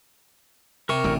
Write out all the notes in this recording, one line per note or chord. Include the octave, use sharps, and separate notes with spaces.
C3 A#4 C#6
A1 D3